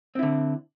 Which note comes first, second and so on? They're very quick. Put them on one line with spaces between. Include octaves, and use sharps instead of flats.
C4 E4 D3